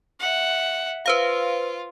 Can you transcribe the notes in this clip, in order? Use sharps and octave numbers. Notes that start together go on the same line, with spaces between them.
E5 F#5
F4 B4 C5 F5